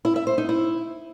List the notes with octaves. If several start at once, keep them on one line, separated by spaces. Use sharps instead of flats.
E4
E5
C5
D#4
E4